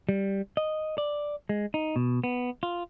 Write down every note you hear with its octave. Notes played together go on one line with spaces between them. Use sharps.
G3
D#5
D5
G#3
D#4
B2
B3
F4